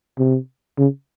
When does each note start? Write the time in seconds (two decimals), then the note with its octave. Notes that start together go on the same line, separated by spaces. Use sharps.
0.18 C3
0.78 C#3